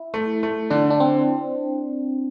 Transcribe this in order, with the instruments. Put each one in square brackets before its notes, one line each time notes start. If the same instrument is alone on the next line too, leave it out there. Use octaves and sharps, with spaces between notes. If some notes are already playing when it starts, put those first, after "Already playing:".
Already playing: [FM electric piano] E4
[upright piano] A3
A3
[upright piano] D3 [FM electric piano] D4
[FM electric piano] D4
C4